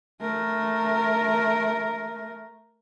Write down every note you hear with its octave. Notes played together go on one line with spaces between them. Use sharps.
A3 A#4